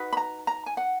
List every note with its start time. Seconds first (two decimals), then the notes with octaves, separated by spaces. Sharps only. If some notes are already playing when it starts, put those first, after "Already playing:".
Already playing: D#4 F#4 B4
0.13 B5
0.17 A#5
0.47 A#5
0.66 G#5
0.77 F#5